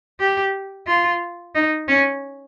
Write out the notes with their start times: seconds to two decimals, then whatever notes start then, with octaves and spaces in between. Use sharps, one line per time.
0.20 G4
0.87 F4
1.55 D#4
1.88 C#4